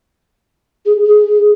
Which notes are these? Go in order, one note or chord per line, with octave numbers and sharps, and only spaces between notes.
G#4
G#4